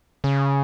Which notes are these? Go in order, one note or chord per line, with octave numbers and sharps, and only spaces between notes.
C#3